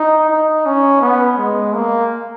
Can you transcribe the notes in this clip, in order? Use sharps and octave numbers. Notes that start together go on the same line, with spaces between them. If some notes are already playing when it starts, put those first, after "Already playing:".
Already playing: D#4
D#4
C#4
B3
G#3
A#3